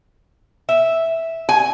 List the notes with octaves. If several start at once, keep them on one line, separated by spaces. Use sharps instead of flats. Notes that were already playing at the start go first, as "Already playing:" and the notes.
E5
G#5